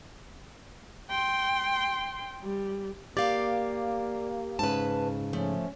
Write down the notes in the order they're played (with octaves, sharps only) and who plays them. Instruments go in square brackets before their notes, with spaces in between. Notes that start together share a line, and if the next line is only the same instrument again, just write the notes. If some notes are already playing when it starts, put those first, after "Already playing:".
[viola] G5 C6
G3
[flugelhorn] A#3 [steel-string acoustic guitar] G4 F5 [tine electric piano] D5
[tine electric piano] G#2 C#3 [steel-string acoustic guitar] B4 A5
[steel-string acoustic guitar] F3 A3 [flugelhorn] C#4